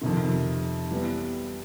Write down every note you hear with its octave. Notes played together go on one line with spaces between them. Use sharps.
F2 C3 D#3
E3 G3 B3